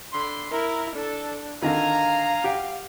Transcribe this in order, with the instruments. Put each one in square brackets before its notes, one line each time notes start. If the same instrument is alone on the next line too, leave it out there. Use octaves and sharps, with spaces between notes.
[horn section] D3 B5 C6
[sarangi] E4 [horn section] A#4
[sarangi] D4 [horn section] A4
[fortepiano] D3 D#3 [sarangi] F5 [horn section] G#5 A#5
[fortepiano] G4 F#5 G5